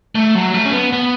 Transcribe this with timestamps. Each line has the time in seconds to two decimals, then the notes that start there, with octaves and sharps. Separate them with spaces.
0.15 A3
0.35 F#3
0.54 A3
0.65 C#4
0.72 B3
0.93 B3